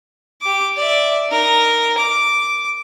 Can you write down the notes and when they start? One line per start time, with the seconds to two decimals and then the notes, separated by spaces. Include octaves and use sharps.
0.42 G4 D6
0.77 D5 E5
1.29 D#4 A#4
1.98 D6